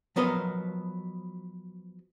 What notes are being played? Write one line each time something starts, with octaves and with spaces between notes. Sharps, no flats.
F3 F#3 B3 A#4 C5 D#5